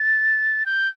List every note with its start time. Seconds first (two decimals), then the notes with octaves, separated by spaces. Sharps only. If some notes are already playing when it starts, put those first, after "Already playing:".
Already playing: A6
0.66 G6